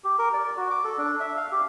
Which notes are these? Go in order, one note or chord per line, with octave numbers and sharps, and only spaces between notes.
G4
A#4
D5
F#4
D6
A4
D4
E5
F5
G4